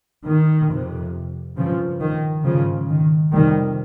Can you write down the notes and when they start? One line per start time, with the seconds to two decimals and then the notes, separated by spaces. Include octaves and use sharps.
0.27 D#3
0.70 F2 C3
1.58 G2 C#3 F3
2.01 D#3
2.45 G#2 C#3 F3
2.89 D#3
3.33 F2 C3 D#3 G3